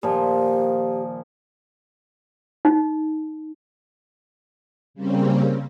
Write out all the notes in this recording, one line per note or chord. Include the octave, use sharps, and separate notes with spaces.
A#2 D#3 F3 G4
D#4
C#3 G3 A#3 C4 C#4